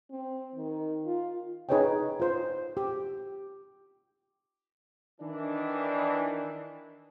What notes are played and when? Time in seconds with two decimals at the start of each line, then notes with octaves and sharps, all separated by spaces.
0.11 C4
0.56 D#3
1.06 F4
1.69 D#4 G#4 B4 C#5 D#5 G5
2.20 F4 C5
2.77 G4
5.21 D#3 E3 D4